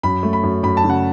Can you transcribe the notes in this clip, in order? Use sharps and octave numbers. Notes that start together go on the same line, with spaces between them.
F#2 B5
A3
B5
F#2
F#2 B5
A5
C#3
F#5